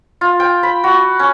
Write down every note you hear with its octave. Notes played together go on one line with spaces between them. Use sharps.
F4
G5
B5
F#4
C#4